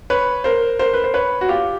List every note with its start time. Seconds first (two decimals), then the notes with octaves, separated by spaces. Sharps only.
0.10 B4 C#5
0.44 A#4 C5
0.79 A#4 C5
0.94 B4
1.04 C5
1.14 B4 C#5
1.41 F#4
1.48 F4 G4